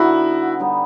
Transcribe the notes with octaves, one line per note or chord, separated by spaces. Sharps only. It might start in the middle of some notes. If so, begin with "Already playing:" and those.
Already playing: D3 G3 B3 D#4 E4 F#4
D3 G3 B3 D#4